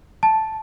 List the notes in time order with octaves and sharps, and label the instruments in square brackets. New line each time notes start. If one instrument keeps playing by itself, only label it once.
[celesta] A5